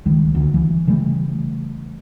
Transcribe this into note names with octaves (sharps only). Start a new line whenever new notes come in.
C#2 D#3 G3
D2
E3
C#3 E3 G3 A3